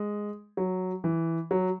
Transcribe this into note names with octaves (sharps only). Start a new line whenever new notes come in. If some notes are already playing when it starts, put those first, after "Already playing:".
Already playing: G#3
F#3
E3
F#3